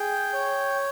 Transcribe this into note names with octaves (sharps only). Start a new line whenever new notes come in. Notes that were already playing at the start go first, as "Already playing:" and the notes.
Already playing: G#4 G5
C#5